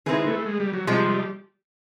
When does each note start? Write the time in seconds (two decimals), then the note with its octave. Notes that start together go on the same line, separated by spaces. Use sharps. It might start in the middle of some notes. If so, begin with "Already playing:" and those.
0.06 D#3 G#3 C4 E4 G#4 B4
0.27 A3
0.46 G#3
0.60 G3
0.73 F#3
0.87 C3 F3 G3 G#3